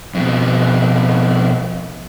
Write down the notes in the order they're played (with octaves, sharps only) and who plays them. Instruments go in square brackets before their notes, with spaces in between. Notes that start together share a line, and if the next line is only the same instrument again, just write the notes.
[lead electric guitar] F2 B2